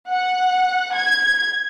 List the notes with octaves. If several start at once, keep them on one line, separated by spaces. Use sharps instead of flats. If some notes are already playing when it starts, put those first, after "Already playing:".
F#5
G#6